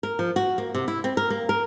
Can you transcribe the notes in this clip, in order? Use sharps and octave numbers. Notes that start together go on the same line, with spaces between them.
A#4
F3
F#4
A#3
C3
E4
C4
A#4
A#3
A#4